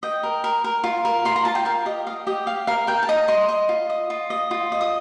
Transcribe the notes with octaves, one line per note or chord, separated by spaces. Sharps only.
D#5 G5
A#4
A#4
A#4
F4
A#4
F4 C6
A#5
F4 A5
G5
A#4 F5
G4 D#5
D#5 F5
G4 D#5
G4 F5
A#4 F5
A#4 G5
A5
D#5 A#5
D#5 C6
D#5
F4
D#5
F4
D#5
F4
D#5
D#6